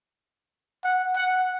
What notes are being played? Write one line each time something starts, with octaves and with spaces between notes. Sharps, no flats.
F#5
F#5